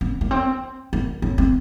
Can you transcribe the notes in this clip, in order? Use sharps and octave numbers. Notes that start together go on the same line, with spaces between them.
C#4
A#3
C4
A#3
C#4
C4